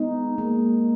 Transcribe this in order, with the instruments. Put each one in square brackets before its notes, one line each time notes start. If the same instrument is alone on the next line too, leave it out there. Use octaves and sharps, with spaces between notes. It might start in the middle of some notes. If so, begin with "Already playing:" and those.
Already playing: [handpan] G#3 D#4 [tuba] B3
[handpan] G#3 [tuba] A#3